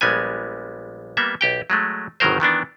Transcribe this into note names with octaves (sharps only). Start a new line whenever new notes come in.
A#1 G3 G#3 B3 G#5
G3 A#3 B3 E5
B1 G4 G5
F#3 G#3 A3
G1 B2 D#3 F#3 A#4 C5
D#3 E3 B3 D4